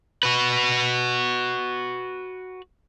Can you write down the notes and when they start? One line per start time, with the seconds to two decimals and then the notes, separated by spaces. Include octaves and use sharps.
0.23 F#4 B4